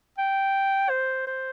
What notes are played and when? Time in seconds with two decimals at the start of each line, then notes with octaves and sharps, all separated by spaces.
0.18 G5
0.90 C5
1.27 C5